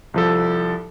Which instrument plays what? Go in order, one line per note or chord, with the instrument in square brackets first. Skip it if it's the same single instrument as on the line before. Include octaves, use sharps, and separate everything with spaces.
[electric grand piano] C2 F3 A4